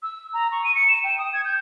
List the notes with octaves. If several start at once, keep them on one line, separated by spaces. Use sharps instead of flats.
E6
A#5
C#6
D#7
C#7
E7
G5
D#6
G#6
G6